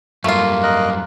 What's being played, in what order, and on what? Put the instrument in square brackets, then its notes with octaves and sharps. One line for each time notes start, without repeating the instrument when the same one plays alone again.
[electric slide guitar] F#2 G3 [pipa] A3 F4 [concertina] A#3
[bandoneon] A#4 D#5 F#6